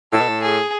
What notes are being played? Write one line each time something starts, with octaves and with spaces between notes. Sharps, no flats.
A2 A4
B2
A2
G#4